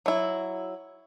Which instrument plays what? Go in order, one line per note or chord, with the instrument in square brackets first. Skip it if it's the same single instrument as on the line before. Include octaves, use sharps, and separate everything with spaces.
[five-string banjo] F#3 E4